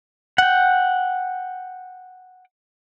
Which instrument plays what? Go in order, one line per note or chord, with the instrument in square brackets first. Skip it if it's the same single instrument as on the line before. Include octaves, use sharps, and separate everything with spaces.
[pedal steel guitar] F#5 G5